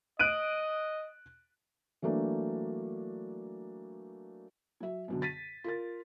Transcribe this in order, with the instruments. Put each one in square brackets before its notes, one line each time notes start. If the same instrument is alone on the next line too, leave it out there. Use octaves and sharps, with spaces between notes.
[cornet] D#5 [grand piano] F#6 D7 D#7
[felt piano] E3 F#3 A3 A#3 D4
F#3 E5
F#2 B2 D3
A6 B6 D#7
F4 A#4 A6